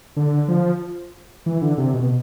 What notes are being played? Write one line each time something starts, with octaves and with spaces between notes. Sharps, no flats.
D3
F3
E3
D3
C3
B2